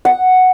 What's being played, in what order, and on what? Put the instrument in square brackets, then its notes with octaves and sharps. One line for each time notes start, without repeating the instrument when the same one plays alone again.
[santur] F#5